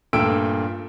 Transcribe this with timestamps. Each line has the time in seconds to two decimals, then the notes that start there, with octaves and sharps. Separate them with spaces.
0.13 G2 A#2 A3 G5 E6 D7